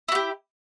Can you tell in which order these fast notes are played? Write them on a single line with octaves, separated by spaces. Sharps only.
E4 F#4 G4